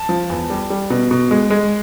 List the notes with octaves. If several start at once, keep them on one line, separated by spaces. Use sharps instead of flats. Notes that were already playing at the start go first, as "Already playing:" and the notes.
Already playing: A5
F3
E2
G3
G3
B2
B2
G#3
G#3